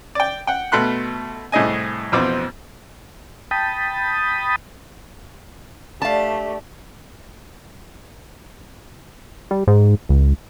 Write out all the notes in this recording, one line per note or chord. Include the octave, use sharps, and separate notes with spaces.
D5 G5
F#5 G5
B2 A3 B5 C6 F#6
C2 A2 G#4 D#5 G#5
A1 F2 B2 C4 D6
G5 A5 B5 D#6
A3 D4 G4 F5 A5
G3
G#2
C#2